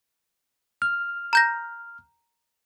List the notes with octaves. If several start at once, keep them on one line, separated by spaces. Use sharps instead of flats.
F6
A#5 G6 A#6